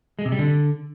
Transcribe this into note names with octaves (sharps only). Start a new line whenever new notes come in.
G#3
C3
G3
D3